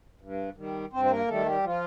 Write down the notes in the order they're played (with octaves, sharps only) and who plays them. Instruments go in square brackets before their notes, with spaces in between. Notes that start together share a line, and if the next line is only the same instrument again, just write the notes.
[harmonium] G2
D#3 G3
G2 C4 C5
C5
A#3 A#4
D#3 G3 A3 A4
G3 G4
F3 F4